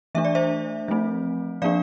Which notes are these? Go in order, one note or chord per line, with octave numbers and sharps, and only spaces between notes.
E3 A3 D4 E5
D5
C5 E5
F3 A3 C4
F3 A#3 D4 D5 F5